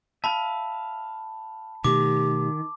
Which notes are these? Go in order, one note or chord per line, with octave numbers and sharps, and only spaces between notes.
E5 F5 A5 B5
B2 D#3 A3 G4 D6